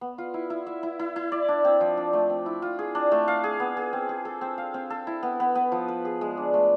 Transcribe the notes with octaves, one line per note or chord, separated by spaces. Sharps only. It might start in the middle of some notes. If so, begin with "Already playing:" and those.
B3
F4
E4
E4
E5
E4
E4
E4
D5
D4
C4
F3
D4
A3
C4
E4
F4
G#4
D4
A3
F5
G#4
B3
G#4
C4
G#4
A4
C4
F5
C4
A4
E4
B3
B3
B3
F3
B4
G#4
G#3
D4
A3